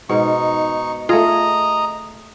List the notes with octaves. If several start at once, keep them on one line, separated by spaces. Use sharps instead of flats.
G#2 B2 D#4 C#6
A3 F4 G#4 D#5 A#5